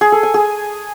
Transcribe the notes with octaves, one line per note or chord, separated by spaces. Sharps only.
G#4
A4
G#5
G#4